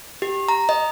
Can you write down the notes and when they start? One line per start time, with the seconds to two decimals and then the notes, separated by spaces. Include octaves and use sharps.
0.22 G4
0.49 A#5
0.69 D#5